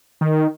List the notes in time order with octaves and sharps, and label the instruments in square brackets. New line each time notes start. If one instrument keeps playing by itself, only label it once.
[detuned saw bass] D#3